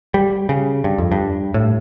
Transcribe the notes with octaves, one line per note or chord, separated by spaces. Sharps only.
G3
C#3
G2
F2
G2
A2